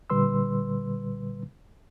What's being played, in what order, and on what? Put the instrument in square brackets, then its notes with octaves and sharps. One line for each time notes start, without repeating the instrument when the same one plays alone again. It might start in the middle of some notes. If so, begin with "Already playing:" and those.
[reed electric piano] A#2 D3 G3 B4 C6 E6